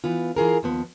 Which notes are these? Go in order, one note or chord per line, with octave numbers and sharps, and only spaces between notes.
E3 B3 F4
E3 F4 G#4 A#4
D#2 F3 B3